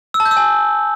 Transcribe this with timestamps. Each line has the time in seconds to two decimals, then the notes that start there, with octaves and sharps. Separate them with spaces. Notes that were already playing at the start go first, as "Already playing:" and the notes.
0.14 E6
0.20 A5
0.26 G6
0.31 E6
0.37 G#5